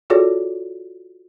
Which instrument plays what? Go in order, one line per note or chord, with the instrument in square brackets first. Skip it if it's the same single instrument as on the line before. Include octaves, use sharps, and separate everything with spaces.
[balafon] F4 F#4 G#4 A4 C#5 D5